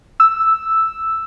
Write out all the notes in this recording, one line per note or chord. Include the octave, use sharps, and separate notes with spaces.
E6